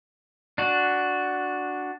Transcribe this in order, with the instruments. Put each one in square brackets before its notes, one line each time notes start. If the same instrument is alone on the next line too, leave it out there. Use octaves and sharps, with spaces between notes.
[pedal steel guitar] D4 F#4